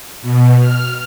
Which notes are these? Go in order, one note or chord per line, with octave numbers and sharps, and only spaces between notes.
B2
F6